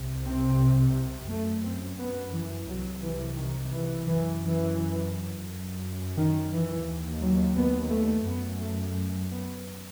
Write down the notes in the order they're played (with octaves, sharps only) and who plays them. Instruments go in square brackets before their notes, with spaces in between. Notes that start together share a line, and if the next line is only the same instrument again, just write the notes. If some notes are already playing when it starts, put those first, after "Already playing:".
Already playing: [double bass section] C2 C3
C4
F#2 A3
C4
B3
E3
C2 C3 F#3
E3
D#3
E3
F#2 E3
E3
F#2
D#3
E3
D#2
F#3
B3
A3
F#2 B3
A3
B3